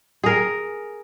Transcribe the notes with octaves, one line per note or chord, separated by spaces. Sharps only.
G#4 A#4